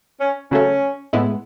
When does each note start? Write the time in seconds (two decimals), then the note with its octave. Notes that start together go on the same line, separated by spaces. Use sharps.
0.20 C#4
0.51 C#3 F#3 A3 C#4
1.13 A2 G#3 B3 E4